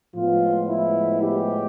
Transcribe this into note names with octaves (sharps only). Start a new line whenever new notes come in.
A2 F3 G#3 B3 F4
E4
G4